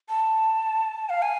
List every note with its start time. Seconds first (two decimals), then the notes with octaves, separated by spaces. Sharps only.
0.09 A5
1.09 F5
1.22 G#5